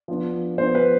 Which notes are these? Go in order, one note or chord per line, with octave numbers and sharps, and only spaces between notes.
F3 B3 D4
F3 B3 D4 C5
B4